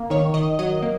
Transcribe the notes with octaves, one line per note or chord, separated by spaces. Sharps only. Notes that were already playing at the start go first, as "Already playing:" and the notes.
Already playing: A#3
D#3 C#5
D#3 D#5
F#3 D#5
A#3